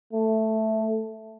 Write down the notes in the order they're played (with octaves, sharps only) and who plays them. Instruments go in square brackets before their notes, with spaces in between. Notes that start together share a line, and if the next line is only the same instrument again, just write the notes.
[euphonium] A3